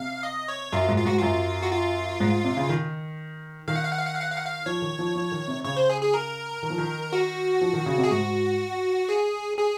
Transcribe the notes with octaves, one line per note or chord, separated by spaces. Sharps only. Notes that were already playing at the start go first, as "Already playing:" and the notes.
Already playing: C3 F5
D#5
C#5
F#2 F4
G#2
F4
G#2 F#4
F#2 F4
F#4
F4
G#2
C3
C#3
D#3
D#3 F5
F#5
F5
F#5
F5
F#5
F5
F#5
F5
F#5
F5
F3 C#5
D#3
F3
F3
D#3
C3
C#3 C#5
C5
G#4
G#4
A#4
D#3
F3
D#3
F#4
F3
D#3
C#3
C3
G#4
G#2 F#4
G#4
G#4